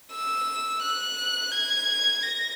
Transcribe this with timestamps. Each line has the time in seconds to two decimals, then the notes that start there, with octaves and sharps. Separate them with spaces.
0.12 E6
0.82 F#6
1.52 G#6
2.23 A#6